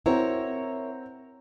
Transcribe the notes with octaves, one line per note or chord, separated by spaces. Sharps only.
C4 E4 F#4 A#4 C#5 A#5